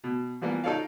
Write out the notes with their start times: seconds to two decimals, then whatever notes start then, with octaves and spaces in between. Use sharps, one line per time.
0.04 B2
0.41 E3 F3 G3 A#3 B3
0.64 D#4 F4 A4 C#5 D5 F5